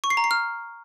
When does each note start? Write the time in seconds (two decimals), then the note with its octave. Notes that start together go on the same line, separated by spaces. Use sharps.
0.04 C#6
0.10 C7
0.17 A#5
0.24 C7
0.31 F6